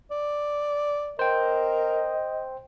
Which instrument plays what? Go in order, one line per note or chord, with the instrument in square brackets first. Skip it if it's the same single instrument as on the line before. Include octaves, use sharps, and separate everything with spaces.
[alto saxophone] D5
[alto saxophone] A#4 [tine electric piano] C5 G5 [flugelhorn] D#5